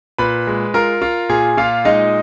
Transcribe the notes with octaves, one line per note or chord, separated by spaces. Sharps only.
A#2 B4 B5
G#3
F4 A#4 A#5
F4
A#2 G#4 G#5
A#2 F4 F5
G#3 D#4 D#5